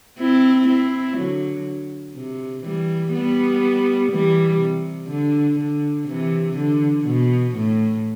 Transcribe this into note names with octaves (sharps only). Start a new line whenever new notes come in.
C4 E4
C4 E4
D3 F#3
C3
E3 G3
G3 B3
E3 G3
C3
D3
D3
C3 E3
D3
B2
A2